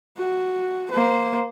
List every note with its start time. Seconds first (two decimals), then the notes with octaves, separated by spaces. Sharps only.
0.17 F#4
0.91 A#3 C5